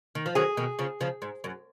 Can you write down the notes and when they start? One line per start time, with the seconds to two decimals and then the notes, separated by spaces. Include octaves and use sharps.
0.15 D#3
0.26 F3
0.35 D#3 F#3 G#4
0.57 B2 D#3
0.79 C#3 F3
1.01 C#3 F3
1.22 G#2
1.44 F#2